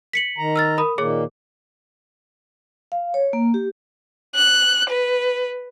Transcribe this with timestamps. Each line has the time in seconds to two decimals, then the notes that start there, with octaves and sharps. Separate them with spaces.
0.13 B6 C#7 F#7
0.38 D#3 A#5
0.56 E6 F6 A6
0.78 A#4 B5 D#6
0.98 A#2 D#3 A#3 G#4 C#5 D6
2.92 F5
3.14 C#5
3.33 A#3
3.54 G4
4.35 F#6
4.90 B4